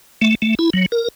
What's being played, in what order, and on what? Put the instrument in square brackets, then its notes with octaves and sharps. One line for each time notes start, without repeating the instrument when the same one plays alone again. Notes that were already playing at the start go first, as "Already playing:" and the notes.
[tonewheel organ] A3
A3
E4
F#3
A#4